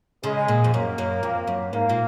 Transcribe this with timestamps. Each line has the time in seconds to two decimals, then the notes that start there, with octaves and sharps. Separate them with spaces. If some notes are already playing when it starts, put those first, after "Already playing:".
0.23 C#3 G#3
0.48 A#2
0.64 F2
0.73 F#2 A#3
0.98 F#2
1.23 F2
1.47 F#2
1.73 G#2 A#3
1.89 A#2